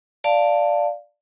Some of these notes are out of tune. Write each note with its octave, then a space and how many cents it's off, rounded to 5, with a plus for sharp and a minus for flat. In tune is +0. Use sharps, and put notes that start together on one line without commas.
D5 +0 F5 +0 A5 +10